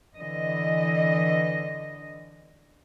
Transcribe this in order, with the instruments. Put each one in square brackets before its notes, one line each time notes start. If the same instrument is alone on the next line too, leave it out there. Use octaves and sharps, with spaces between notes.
[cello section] D3 E3 D#5